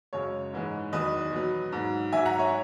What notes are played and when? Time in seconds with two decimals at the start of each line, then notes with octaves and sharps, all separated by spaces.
0.13 F#2 C#3 G#3 C#5
0.53 G#2 E3 G#3
0.92 E2 D#3 F#3 B4 D#5
1.32 B2 F#3
1.72 G#2 F#3
2.12 G#2 F#3 E5 G#5
2.25 F#5 A#5
2.39 C#5 E5